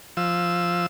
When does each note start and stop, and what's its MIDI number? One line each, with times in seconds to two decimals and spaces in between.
0.17 0.86 53
0.17 0.86 88